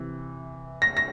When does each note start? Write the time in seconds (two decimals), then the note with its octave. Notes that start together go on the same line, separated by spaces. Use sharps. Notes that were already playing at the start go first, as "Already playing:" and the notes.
Already playing: C3 E3
0.82 A#6
0.97 A#6